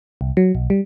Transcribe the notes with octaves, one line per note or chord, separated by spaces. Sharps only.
C2
F#3
B1
G3